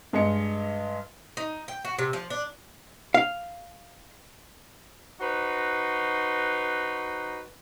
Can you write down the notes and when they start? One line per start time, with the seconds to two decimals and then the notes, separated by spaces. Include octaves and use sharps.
0.13 G2 G#3 D#5 C#7
1.37 D#4
1.68 G5
1.85 F#4
1.99 C3
2.13 F3
2.30 D4
3.14 F5
5.20 D#4 F#4 B4 C5